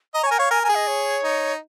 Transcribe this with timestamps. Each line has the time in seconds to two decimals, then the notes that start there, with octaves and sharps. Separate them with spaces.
0.14 D#5 A#5
0.23 C#5
0.27 A#4 G#5
0.38 C#5 F5
0.51 A#4 G#5
0.63 A#4 G#5
0.69 G#4
0.75 D#5
0.87 C#5
1.24 D#4